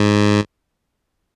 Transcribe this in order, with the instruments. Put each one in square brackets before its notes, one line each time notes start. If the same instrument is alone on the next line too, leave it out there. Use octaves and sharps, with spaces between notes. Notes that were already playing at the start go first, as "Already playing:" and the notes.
Already playing: [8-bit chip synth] G#2